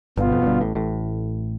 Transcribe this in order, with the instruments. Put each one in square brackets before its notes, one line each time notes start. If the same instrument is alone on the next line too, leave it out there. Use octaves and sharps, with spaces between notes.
[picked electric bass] G1 G2 [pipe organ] B2 B3 F4
[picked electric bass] F2
F2
G1 G2
A1 A2
A1 A2